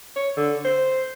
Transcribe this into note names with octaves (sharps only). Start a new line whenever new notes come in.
C#5
D3
C5